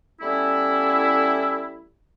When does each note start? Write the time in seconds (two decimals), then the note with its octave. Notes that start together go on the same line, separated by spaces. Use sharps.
0.21 G3 A3 B3 C#4 E4